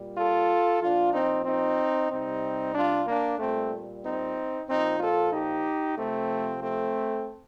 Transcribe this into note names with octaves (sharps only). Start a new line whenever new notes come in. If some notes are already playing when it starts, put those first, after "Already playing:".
Already playing: A#2 G3
F4 A4
A#2 F3 D4 F4
C4 D#4
C4 D#4
C3 G3 C4 D#4
D4 F4
A#3 D4
A#2 G3 A3 C4
C4 D#4
A#2 F3 C4 D#4
F4 A4
D#4 G4
C3 F3 A3 C4
A3 C4